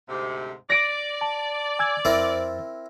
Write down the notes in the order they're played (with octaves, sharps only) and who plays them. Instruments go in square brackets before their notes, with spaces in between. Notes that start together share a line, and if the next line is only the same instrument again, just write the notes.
[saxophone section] D2 G#2 C3
[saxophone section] D5 [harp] A#6 D7
[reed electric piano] A5
G#5 E6 G#6
[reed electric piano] F2 C5 A6 [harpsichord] C4 E4 A#4